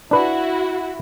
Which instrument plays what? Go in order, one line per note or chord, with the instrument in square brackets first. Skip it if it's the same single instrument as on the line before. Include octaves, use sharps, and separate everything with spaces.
[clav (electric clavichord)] D4 B4 [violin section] E4 F#4